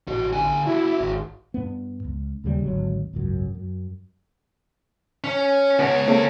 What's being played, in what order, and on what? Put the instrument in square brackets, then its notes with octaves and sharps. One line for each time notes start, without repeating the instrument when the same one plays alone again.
[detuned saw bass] A1 [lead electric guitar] F#4 D#5
[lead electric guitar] D3 G#5
[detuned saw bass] E4 [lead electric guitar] F#4 G#4
[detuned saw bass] G#1
[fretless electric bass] G2 B3
C#2
D#2 C#3 F#3 G3
G#1 D2 F#3
G#1 C#2 F#2
F#2
[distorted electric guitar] C#4
[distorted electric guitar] C#2 C#5 [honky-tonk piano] B3
[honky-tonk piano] A#3 C4 A4